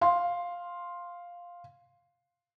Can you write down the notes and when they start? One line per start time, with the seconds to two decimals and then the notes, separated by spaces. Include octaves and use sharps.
0.01 F5 C6